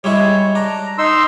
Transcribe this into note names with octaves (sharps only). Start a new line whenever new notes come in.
G3 G#3 E4 C#5
D4 A#5
D#4 C6 E6